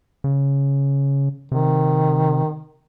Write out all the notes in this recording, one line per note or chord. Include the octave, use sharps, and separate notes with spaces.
C#3
C3 D#3